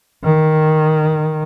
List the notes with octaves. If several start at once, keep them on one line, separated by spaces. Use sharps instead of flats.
D#3